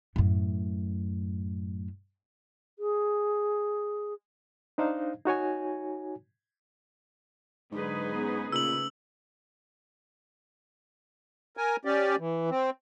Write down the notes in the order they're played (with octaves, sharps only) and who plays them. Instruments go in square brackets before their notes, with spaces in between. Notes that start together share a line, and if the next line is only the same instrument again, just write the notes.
[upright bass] F#2 A2
[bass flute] G#4
[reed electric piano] D4 D#4 C5 D#5 F5
D#4 F#4 C#5 G#5
[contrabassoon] G#2 [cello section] D3 F#3 [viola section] D#4 G#4 B4
[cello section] B3 C#4
[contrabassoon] A#2 [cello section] C#3 A3 [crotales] E6 F#7
[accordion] A#4 G#5
C#4 G4 D5
E3
C4